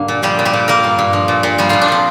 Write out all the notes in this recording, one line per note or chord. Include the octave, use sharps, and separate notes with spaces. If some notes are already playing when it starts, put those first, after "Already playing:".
Already playing: G2 D3 A#3
A#2
F3 G3 G4
A#2
G3 G4
A#2
G3 A#3 A#4
G2
G2
F3
A#2
A#2
F3 G3 G4
A#2 F3 F4
D4
A#2 C4